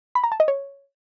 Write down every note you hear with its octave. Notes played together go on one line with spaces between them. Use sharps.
B5
A#5
A5
D#5
C#5